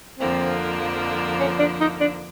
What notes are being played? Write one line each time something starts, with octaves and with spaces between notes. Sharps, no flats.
F2 D3 F3 A#3 C4
C#4
D4
D#4
D4